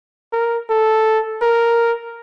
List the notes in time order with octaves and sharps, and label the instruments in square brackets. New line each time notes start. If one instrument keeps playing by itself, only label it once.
[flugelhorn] A#4
A4
A#4